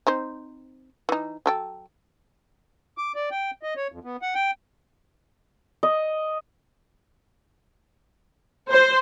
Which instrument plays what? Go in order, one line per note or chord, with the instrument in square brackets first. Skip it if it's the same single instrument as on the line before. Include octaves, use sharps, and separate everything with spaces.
[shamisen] C4 D#4 C5
E3 D#4
F#3 A4 G5
[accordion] D6
D5
G5
D#5
C#5
F2
B3
F#5
G5
[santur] D#5
[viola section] C5